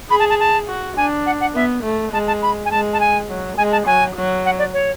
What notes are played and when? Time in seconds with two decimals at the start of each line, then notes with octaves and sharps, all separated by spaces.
0.10 G#4 B5
0.19 A5
0.30 A5
0.40 A5
0.68 F#4
0.97 D4 G#5
1.26 F#5
1.40 F#5
1.54 B3 E5
1.83 A3
2.13 G#3 A5
2.27 A5
2.42 B5
2.65 G#5
2.71 G#3 A5
2.93 A5
3.00 G#5
3.29 F#3
3.57 G#3 G#5
3.72 A5
3.86 F#3 G#5
4.16 F#3
4.45 F#5
4.59 D5
4.74 C#5